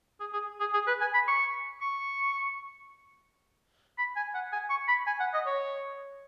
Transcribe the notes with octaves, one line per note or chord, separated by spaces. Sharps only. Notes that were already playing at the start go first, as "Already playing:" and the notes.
G#4
G#4
G#4
G#4
B4
G#5
B5
C#6
C#6
B5
G#5
F#5
G#5
C#6
B5
G#5
F#5
D#5
C#5